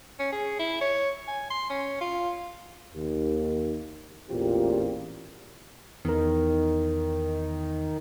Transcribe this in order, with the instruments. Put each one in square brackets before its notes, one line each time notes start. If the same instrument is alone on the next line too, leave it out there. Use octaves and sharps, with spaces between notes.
[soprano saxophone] C#4
G#4
E4
C#5
G#5
C6
C#4
F4
[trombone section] D#2
A1 E2 A#2 C4 F4 G4
[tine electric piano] E2 A#4 [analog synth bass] D#3